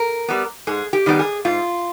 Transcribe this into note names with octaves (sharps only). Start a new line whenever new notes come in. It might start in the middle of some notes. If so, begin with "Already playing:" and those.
Already playing: A#4
G3 B3
G#2 G#4
G4
D#3 G3 B3
G#4
G#2 F4